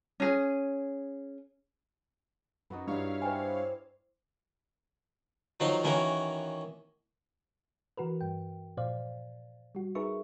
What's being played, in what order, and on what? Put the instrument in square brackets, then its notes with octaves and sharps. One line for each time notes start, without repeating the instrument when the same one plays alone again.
[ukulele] C#4 G#4
[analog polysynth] F#2 [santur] D#4 F#4 B4
[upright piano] G2 [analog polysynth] E4 C#5 F5
[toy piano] B4 G#5 [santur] C5 D5 G5
[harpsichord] D#3 F3 F#3 D#4 C6
D#3 E3 A#3 C#4 F#4 A#4
[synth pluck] E3 F#4 A#4 B4
G2 G5
A#2 F3 C5 D5 F5
G3 F#4
D#4 G#4 A#4 B4 E5 C#6